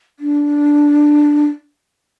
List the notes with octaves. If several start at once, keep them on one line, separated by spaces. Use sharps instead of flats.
D4